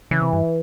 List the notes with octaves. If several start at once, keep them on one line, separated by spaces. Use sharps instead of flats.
C#3 E3
C3
G2